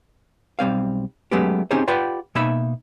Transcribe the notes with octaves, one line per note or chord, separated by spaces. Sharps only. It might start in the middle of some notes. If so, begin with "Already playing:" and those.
B1 G3 C4 F5
F#3 G#3 A3 B3 C#4 G4
C4 C#4 D#4 G4 G#4 C5
F4 G4 B4 D5 F#5 G5
B2 A#3 D#4 E5 B5